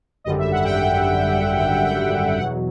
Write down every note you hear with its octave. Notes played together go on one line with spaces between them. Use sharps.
G#1 F#2 D3 G3 D#5
E5
F#5
G5
G5
E2 B2 F#3 F#5